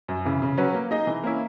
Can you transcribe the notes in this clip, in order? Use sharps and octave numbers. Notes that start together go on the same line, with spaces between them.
F#2
C#3 E3
C#3
F#3 C#4 F#4 B4
A#3
D#4 G#4 D#5
E3
A#3 C#4 E4